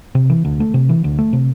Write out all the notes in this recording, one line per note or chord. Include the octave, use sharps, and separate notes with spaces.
C3
E3
D2
A3
C3
E3
D2
A3
C3